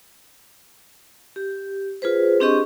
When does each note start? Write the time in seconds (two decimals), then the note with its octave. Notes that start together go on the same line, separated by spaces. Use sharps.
1.36 G4
2.02 F4 G#4 B4 C5
2.40 C4 D4 G4 G#4 D#5 C#6